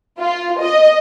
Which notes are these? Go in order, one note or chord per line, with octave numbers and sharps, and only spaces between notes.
F4
D#5